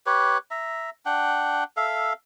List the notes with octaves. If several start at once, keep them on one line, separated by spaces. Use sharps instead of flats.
G4 B4 C#5
E5 A#5
D4 F#5 G5
A4 E5 F5